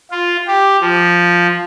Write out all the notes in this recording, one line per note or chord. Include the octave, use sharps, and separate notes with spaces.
F4
G4
F3